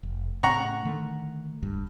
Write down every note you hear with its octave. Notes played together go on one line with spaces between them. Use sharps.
F1
A2 C#3 F#5 A#5 C#6
D3 D#3 A3
D#1 C#2 G2